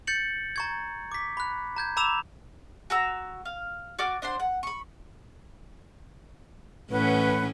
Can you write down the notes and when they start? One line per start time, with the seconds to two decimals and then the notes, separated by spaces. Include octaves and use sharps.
0.07 G6 A6 C#7 F#7
0.56 A#5 C#6 G#6
1.12 D6 B6
1.37 B5 F#6
1.77 A#5 G6 G#6
1.97 A#5 B5 D6 E6 E7 F7
2.90 F#4 A#5 E6
3.45 F5
3.99 F#4 D5 D6 F6
4.22 D4 C5 F#5 C6
4.40 F#5
4.63 B5 C#6
6.91 A2 E3 C#4 B4 F#5